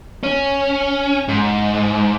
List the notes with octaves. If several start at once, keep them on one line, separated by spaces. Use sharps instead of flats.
C#4
G#2